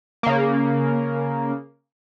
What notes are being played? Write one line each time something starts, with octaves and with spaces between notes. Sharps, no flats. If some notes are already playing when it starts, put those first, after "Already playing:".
C#3 A#3